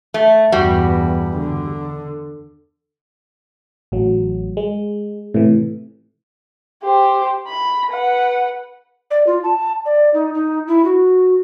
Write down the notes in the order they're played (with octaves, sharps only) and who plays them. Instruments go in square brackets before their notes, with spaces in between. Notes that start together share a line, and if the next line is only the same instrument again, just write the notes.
[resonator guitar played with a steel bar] A3
[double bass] E2 G2 [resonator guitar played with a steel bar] G3 F#4
[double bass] D3
[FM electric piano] A1 F#3
G#3
A2 C3 E3
[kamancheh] G4 C5
B5
B4 F#5
[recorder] D5
F4
A5
D5
D#4
D#4
E4
F#4